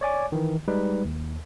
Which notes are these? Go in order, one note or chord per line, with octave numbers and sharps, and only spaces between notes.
C#5 D5 G#5 D6
D#3 E3
G3 G#3 D#4 B4
D#2